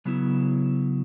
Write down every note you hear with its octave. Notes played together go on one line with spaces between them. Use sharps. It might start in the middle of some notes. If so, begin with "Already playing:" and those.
C#3 F#3 B3 E4